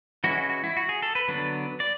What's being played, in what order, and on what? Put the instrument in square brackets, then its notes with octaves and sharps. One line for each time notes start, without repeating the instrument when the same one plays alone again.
[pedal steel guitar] E3 G#3 C#4 E4 F#4
F#4
F#4
E4
F#4
G#4
A4
B4
D3 F#3 B3 D4
D5